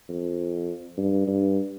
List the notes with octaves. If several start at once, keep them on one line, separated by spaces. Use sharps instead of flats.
F2
G2
G2